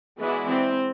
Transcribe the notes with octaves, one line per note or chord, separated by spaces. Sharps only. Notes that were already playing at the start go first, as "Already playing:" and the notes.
E3 G#3 B3 E4 F#4 D5
C4